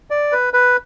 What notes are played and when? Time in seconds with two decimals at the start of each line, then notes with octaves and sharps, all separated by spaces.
0.11 D5
0.32 B4
0.54 B4